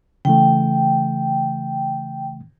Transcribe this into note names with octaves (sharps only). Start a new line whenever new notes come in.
C#3 E3 A3 G5